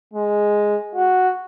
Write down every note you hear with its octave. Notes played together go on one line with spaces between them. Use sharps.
G#3
F#4